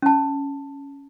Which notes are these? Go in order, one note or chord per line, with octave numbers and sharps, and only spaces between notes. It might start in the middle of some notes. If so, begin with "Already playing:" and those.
C#4 A5